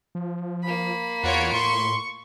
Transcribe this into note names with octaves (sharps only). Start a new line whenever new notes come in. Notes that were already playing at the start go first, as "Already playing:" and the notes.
F3
A#3 B5
E2 F4 F#4 C#5 D7
A2 C6 C#6